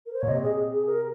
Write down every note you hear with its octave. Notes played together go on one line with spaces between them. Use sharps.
A#4
C5
A#2 C#5
C3 D#5
G#4
G#4
A#4